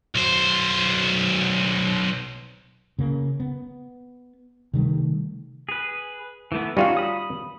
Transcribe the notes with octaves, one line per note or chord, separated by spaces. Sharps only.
B1 C5
C#3 A#3
B3
C3 D#3 G3 A3
G#4 B4
E3 A3 B3
G3 C#4 D#4 F4 F#4 F5
B5 D#6